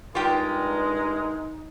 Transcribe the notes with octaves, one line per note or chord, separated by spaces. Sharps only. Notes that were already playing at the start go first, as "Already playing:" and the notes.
G2 G#3 D#4 F4 G4 A#4 G5 A#5